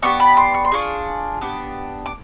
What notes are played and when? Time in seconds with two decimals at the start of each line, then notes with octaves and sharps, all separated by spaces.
0.02 B3 D4 G4 C#6
0.20 B5
0.37 C6
0.54 C#6
0.65 C6
0.72 D4 F4 G#4 C#6
1.41 B3 D4 G4
2.06 D6